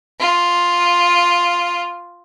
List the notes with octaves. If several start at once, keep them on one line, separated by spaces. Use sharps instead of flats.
F4